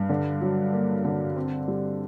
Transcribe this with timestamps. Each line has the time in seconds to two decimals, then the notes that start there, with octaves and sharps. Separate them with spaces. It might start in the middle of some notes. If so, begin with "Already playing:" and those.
Already playing: G2
0.09 D3
0.41 F#3
0.73 A#3
1.05 D3
1.36 C4
1.68 G3